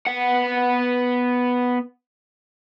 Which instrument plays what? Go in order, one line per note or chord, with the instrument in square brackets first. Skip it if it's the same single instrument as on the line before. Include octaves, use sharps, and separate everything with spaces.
[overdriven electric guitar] B3 F#5